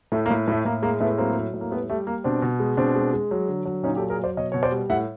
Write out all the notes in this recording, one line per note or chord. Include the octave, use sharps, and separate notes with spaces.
A2 A3
A#3
A2
A2 A3
A2 A#3
G#3 A#3
A2 A3 B3
F#3 A#3 C4
F#3
A2
A#3
G3 A3 B3
G3 A3
G3 A#3
B2 C4 D4
B2
G#3
B2 C4 D4
G#3
G#3
F#3
D3
F#3
A#2 C#4 D#4
G4 A4
F#3
G#4 A#4
F#3 C5 D5
B2 C#5 D#5
B2 C#5
C5 D5
G3
A2 E5 F#5